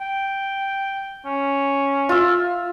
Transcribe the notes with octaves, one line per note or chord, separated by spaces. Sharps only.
G5
C#4
F4 E5